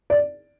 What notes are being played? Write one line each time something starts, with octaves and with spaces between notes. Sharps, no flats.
D5